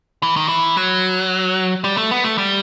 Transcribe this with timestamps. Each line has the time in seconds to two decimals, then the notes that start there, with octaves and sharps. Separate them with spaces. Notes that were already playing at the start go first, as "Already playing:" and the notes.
0.23 E3
0.36 D#3
0.48 E3
0.77 F#3
1.84 G3
1.97 A3
2.11 B3
2.24 A3
2.38 G3